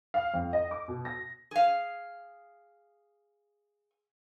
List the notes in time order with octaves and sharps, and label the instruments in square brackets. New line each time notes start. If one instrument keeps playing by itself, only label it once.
[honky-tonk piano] F5
F2
D#5
D6
B2
A#6
[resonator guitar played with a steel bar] G#4 F5